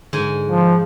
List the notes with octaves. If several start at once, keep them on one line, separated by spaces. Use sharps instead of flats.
G#2 D3 G#5
F3